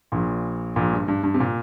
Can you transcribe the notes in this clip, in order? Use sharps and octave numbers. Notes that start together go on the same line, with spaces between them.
A#1 A#2
A#1 A#2
G2
G2
G2
C3
A#2